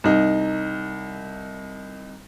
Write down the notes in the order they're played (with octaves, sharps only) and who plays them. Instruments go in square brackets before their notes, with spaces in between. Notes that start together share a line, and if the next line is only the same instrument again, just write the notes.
[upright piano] C2 D#4